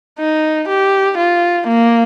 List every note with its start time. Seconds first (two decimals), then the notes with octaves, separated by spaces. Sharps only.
0.19 D#4
0.68 G4
1.18 F4
1.68 A#3